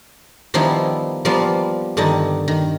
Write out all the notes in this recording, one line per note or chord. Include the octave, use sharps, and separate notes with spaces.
D#3 F3 G3 B3 D#4 E4
F3 G3 A#3 B3 F4
G2 D3 D#3 D#4
D#3